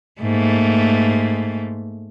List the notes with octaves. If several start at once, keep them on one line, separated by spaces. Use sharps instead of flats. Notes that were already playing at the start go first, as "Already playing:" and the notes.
G#2 A3 A#3